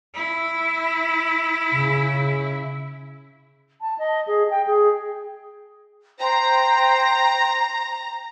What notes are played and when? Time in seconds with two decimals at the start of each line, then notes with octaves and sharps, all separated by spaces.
0.14 E4
1.74 C#3
3.81 A5
3.98 D#5
4.27 G#4
4.50 G5
4.67 G#4
6.19 C5 G5 A#5